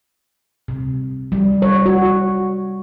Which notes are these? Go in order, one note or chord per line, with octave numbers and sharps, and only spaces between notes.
C3
G3
C#5
F#4